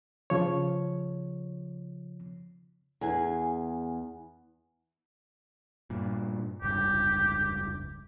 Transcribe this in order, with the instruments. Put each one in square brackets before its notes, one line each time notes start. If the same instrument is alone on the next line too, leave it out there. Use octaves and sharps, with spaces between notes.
[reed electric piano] C#3 F3 C#5
[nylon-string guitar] E2 G#4 G#5
[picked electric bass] G2 A#2
[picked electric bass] F1 C#2 G2 [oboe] G4